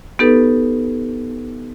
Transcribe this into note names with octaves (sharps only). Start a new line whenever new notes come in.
B3 D#4 G4 A4 B4